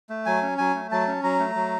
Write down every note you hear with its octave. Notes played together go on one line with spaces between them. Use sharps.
A3
F#3 G#5
C#4
F#3 G#5
A3
F#3 A5
C#4
F#3 A#5
A3
F#3